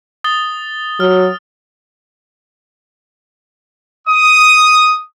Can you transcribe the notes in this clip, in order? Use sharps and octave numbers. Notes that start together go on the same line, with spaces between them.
D#6 A6 G7
F#3 F6
D#6